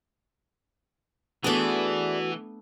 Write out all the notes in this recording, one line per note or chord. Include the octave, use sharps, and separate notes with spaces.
E3 A3 B3 D4 F#4 G#4 D5